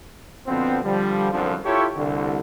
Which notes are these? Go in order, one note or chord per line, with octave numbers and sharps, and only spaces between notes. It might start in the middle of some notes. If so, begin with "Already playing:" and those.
B2 D3 F3 B3 C4
D3 F3 G3
C2 F#2 D3 F3
E4 F4 G4 A4 C#5
C2 D3